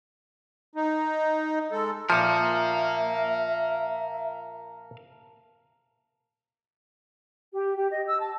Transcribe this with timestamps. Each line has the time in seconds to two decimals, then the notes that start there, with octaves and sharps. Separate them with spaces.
0.76 D#4
1.72 G#3 A4
2.10 A#2 F3 A#4 E5 F5 A5 C#7
7.53 G4
7.77 G4
7.91 D#5
8.07 E6
8.20 A5